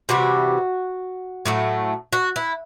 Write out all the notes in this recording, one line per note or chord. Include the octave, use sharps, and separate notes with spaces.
C3 E3 G3 F#4
A2 F#3 A3
F#4
E4